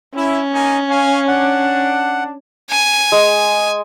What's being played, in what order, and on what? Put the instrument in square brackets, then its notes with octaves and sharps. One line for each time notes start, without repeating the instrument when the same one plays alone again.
[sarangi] C#4 [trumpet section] E4
[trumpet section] A#3 D#4 G#5
C#5 F5 G#5
[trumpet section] D4 [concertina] F#5
[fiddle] G#5
[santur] G#3